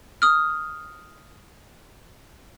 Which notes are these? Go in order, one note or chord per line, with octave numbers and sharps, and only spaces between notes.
D#6 F6